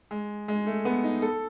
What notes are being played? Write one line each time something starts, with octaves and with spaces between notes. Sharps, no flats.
G#3
G#3
A3
B3
D#4
A4